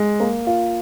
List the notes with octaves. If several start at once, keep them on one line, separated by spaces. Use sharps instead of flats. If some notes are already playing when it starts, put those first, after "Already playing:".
Already playing: G#3
A#3
F4